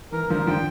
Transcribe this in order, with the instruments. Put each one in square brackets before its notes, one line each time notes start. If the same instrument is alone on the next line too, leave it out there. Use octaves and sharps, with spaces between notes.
[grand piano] E3 [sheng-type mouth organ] A#4
[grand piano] D3 F3 [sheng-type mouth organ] A#4
[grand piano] D3 F3 [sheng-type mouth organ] G5